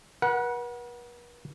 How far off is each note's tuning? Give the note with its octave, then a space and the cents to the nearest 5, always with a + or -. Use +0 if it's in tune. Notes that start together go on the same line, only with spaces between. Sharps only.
B4 -45 F#5 +0